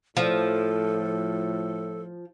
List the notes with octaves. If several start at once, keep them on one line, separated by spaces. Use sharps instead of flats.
A2 F3 A4